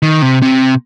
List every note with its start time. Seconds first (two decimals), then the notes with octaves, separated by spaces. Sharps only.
0.02 D#3
0.22 C3
0.42 C3